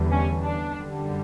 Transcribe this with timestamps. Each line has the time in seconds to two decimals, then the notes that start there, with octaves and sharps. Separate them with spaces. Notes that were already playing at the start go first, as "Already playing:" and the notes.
Already playing: E2 D3 G3
0.11 C#4
0.44 D4
0.76 F#2 D3 G3